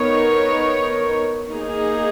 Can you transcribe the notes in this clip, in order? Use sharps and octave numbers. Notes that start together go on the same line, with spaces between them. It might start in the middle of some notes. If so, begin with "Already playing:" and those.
Already playing: B3 D#4 A#4 C#5
A#3 D#4 G#4